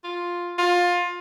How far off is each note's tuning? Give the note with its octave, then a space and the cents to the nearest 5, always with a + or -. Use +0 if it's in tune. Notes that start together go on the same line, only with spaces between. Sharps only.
F4 +5
F4 +20